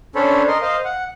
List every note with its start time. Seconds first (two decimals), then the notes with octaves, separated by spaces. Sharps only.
0.15 C#4 D4 A4 C5 C#5 B5
0.48 A#4 D#5 C6
0.62 C5 D#5 F5
0.85 F#5